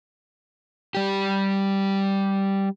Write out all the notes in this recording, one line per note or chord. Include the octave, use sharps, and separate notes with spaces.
G3 G4